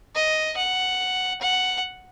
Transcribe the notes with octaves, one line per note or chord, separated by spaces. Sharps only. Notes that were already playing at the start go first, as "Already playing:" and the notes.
D#5
F#5
F#5